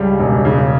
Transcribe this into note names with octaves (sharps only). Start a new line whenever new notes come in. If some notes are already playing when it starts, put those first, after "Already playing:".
Already playing: C#2 C#3 G3
E1
C#3